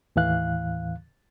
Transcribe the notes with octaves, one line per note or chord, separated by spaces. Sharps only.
D#2 A2 E3 F5 F#6